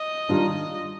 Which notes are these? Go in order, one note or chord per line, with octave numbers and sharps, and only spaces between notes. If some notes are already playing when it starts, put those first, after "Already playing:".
Already playing: D#5
D#3 G3 D4 F4